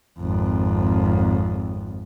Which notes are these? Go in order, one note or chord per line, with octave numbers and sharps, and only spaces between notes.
G#1 F2